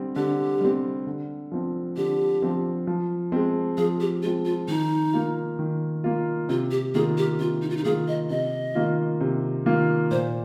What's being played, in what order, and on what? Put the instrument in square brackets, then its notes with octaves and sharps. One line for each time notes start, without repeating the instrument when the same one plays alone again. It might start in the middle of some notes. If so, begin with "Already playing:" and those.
Already playing: [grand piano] D3 G3 C4
[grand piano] D3 [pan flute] G4
[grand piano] G3 C4
D3
F3 C4
[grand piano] D3 [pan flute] G4
[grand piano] F3 C4
F3
G#3 C4
[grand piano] F3 [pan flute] G#4
[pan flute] G4
[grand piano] G#3 C4 [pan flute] F4
[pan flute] F4
[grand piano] D#3 [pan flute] D#4
[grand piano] A#3 F4
D#3
A#3 F4
[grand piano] C3 [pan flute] F4
[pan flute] G4
[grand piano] D#3 A#3 F4 [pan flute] G#4
[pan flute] G4
[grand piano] C3 [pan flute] F4
[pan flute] D#4
F4
D#4
[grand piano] D#3 A#3 F4 [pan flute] G#4
[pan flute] D#5
[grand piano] C3 [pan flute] D#5
[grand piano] D#3 A#3 F4
C3
D#3 A#3 F4
[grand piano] A#2 [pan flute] C5